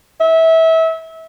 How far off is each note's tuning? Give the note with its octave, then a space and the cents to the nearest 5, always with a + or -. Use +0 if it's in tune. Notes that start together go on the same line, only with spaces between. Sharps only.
E5 -25